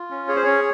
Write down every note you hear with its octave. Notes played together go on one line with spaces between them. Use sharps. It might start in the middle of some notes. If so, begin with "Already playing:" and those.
Already playing: F4
C#4
G#4 C#5
C5
C#4 C#5